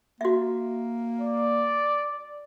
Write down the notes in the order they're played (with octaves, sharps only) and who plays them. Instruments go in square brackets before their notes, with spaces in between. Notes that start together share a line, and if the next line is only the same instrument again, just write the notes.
[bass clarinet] A#3 [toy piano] F#4 E5
[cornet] D5